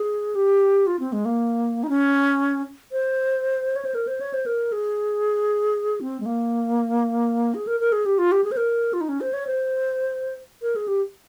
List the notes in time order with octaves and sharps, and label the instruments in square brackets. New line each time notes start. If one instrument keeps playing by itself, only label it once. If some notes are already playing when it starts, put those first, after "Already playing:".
Already playing: [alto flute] G#4
G4
F4
C4
G#3
A#3
D#4
C#4
C5
C#5
C5
A#4
C5
C#5
C5
A#4
G#4
C4
G#3
A#3
G#4
A#4
A#4
G#4
G4
F4
G4
G#4
C5
A#4
F4
D#4
C#4
C5
C#5
C5
A#4
G#4
G4